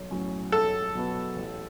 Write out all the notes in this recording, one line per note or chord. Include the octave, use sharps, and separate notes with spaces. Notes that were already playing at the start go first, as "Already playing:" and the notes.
Already playing: B1
A2 F#3 C#4
B1 A4
B2 F#3 B3 F#4
A1